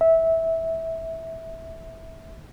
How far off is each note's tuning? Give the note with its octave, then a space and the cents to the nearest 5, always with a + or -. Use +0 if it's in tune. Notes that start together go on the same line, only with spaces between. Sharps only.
E5 -15